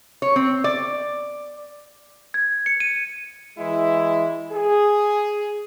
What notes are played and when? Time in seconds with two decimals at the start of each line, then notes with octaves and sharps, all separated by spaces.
0.22 C#5
0.36 C4
0.64 D5
2.34 G#6
2.66 C#7
2.80 D#7
3.57 E3 G#3 E4
4.52 G#4